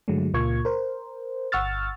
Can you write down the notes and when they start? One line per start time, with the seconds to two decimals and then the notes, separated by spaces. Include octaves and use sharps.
0.08 G2 D3 F#3 G#3 A3
0.34 C#2 A#2 A#3 F4 C#6 G#6
0.65 A#4 C5
1.52 G1 F#5 C#6 E6 F6 A6